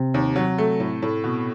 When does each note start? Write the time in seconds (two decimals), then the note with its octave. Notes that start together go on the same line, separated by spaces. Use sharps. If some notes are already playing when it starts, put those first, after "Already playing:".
Already playing: C3
0.14 D#2
0.36 F#3
0.58 A3
0.80 A2
1.02 A2
1.24 B2